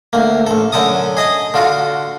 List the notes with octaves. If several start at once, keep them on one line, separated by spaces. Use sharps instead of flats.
D2 A#3
A1 A4
F#2 D3 A4 A5 D#6
G#4 D#5 A5
D3 F4 F#4